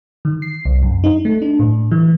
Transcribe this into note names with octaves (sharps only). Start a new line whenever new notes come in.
D#3
C7
C2
F#2
D#4
A3
D4
A2
E3